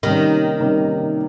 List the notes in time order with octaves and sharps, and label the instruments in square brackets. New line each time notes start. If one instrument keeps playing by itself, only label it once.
[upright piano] C3 G3 A#3 C#4 [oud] D#3
[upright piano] C3 G3 A#3 C#4